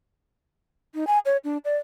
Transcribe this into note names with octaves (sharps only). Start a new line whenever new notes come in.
D#4
G#5
C#5
D4
D5